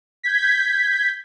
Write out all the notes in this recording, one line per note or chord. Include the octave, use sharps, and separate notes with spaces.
G6 G#6 B6